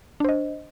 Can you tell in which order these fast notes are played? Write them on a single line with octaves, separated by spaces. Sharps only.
D4 C5 D#5